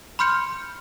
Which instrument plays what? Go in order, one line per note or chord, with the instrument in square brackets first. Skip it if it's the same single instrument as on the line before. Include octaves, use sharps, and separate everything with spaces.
[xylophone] B5 C6 F6 G6 C#7